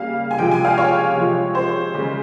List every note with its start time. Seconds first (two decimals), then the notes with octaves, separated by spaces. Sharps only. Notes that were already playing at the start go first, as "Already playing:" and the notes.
Already playing: C#3 G3 A#3 F5
0.31 G#5
0.38 C3 F3 G#3 G5
0.51 G#5
0.65 F5
0.78 C#5
1.16 C3 F3 G#3
1.55 C5
1.95 C#3 G#3